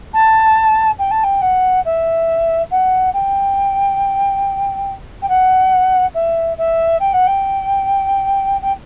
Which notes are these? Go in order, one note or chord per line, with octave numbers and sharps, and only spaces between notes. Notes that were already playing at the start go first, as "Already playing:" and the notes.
A5
G5
A5
G5
F#5
E5
F#5
G5
G5
F#5
E5
E5
G5
F#5
G5
G5